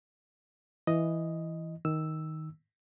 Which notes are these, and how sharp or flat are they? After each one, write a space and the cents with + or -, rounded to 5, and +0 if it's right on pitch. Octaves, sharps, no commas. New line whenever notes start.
E3 +0 D#5 +0
D#3 +10 E6 +0